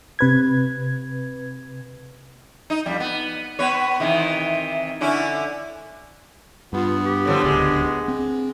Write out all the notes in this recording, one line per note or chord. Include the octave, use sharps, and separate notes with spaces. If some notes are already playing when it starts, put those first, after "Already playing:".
C3 B4 G#6
D#4
F2 G3
B3
B3 B4 C#5
C3 D#3 E3
D3 C#4 E4
G2 B3 F4
G4
A2 D3 F3
D1 C#2 D3 G#3
C4